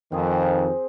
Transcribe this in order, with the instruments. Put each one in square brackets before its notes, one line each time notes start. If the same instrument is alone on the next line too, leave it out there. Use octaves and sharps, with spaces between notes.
[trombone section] F2 D#3 [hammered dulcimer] C4 G#4